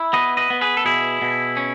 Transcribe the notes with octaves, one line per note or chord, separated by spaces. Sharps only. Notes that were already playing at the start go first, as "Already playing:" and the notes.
Already playing: E4
B3 B4 D#5
B4 D#5
B3
G#4 B4
A4
B2 E4 G#4
B2
C#4